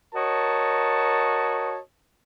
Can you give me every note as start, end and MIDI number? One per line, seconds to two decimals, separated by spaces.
0.15 1.79 66
0.15 1.79 70
0.15 1.79 73
0.15 1.79 75
0.15 1.79 81